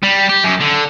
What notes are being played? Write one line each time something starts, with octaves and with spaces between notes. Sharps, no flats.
G3
G4
F#2
D3